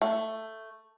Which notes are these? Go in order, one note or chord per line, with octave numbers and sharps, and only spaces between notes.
A3